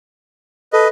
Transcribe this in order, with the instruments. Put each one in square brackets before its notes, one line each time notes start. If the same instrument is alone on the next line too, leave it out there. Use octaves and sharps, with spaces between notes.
[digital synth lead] A4 [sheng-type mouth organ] B4 D#5